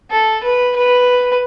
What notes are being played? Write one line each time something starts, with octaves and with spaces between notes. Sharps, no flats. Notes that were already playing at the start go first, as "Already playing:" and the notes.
A4
B4
B4